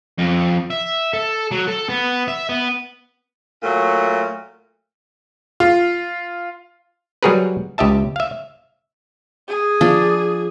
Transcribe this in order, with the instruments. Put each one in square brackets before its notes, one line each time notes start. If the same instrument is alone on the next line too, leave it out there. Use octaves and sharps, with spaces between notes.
[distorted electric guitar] F2
E5
A4
F#3
A4
B3
E5
B3
[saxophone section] A#2 F#3 A3
[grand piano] F4
[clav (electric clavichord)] F#3 G3 F#4 G#4 A#4 B4
C#2 G4 D#5 E5 A5
E5 F5
[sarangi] G#4
[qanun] F3 D4